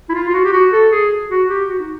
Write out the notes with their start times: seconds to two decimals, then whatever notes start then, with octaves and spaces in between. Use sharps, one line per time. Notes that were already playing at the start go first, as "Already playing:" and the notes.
0.09 E4
0.14 F4
0.29 F4
0.33 F#4
0.44 G4
0.53 F#4
0.73 A4
0.91 G#4
1.30 F#4
1.49 G4
1.69 F#4
1.79 D#4